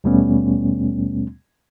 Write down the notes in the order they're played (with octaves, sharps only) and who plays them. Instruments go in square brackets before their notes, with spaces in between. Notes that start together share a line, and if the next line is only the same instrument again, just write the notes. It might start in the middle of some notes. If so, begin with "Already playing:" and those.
[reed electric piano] D#2 B2 G3 A3 B3 C#4